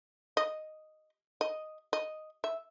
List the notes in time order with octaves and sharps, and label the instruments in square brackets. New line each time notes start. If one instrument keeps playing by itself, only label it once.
[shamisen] D#5
D#5
D#5
E5